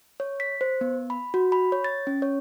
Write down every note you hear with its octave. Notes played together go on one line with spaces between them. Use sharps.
C#5
B6
C5
B3
B5
F#4
B5
C#5
A6
C#4
C#5